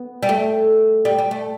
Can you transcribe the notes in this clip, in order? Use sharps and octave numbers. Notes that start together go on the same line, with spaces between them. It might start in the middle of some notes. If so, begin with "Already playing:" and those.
Already playing: B3
G3
A3
G3
G3
A3